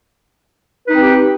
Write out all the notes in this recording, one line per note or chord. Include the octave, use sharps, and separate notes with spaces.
C4 D#4 G4 B4